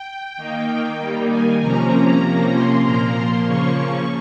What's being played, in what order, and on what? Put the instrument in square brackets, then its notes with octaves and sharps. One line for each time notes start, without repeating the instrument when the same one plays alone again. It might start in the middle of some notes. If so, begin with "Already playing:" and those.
Already playing: [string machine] G5
D#3 A#3 D#4 G5
D#3 G3 A#3 D#4
G#5
C3 F3 A#3 C#4 A#5
C3 F3 A#3 C#4
C6
A#2 F3 A#3 A#5
C6
C#3 F3 A#3 C#4 C#6